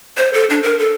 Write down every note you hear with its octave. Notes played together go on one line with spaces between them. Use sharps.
C5
A4
D4
A#4
A4